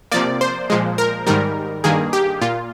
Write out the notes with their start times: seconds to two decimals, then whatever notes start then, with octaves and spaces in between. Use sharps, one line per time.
0.12 C3 F3 A#3 D5
0.41 C5
0.70 A#2 F3 G#3
0.98 A#4
1.27 G#2 D#3 G3 A#4
1.84 G2 D#3 A#3 G#4
2.13 G4
2.42 A#2 F4